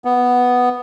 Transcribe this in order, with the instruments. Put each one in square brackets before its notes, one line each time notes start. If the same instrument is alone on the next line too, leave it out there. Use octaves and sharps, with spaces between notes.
[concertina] B3